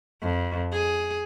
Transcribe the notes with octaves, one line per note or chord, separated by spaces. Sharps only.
F2
G#4